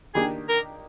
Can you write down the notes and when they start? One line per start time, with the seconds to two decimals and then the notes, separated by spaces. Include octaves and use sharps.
0.15 D#3 A#3 D4 G4 G#4
0.49 A#4